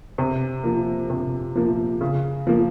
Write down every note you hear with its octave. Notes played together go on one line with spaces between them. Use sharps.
C3
F3 A#3
C3
F3 A#3
C#3
F3 A#3